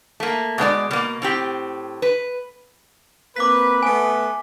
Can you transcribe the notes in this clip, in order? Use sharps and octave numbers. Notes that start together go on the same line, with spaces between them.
A3 A#3
B2 G#3 D4 D5
B2 A#3
A2 C4 G4
B4
A#3 C4 B4 D6 B6
A3 B3 G#5